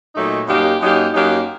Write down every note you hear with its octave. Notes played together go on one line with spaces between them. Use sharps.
A#2 F#3 A3 D#4
F#2 F#3 A#3 D#4 G4
F#2 F#3 A#3 D#4 G4
F#2 F#3 A#3 D#4 G4